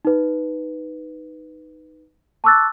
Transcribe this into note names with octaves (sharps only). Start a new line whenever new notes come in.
D#4 B4
A5 C#6 D6 E6 F#6 A6